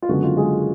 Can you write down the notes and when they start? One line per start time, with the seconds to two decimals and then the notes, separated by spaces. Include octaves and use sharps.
0.02 F4
0.09 F#1 F#2 D3 G#3 B3 F#4
0.24 F4
0.37 G#3 G#4